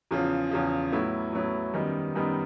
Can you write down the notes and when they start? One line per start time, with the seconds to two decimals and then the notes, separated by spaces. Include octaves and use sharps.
0.11 E2 C#3 F3
0.51 E2 C#3 F3
0.92 A2 F#3 B3 E4
1.33 A2 F#3 B3 E4
1.74 F#2 D#3 G3 B3 D#4
2.15 F#2 D#3 G3 B3 D#4